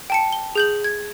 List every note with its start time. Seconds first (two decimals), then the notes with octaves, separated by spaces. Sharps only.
0.10 G5 A5 C#7
0.33 G7
0.55 G#4 G6 F#7
0.84 G#6